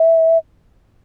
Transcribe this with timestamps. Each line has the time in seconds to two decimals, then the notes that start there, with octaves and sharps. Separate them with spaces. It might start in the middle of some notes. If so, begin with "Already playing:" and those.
Already playing: E5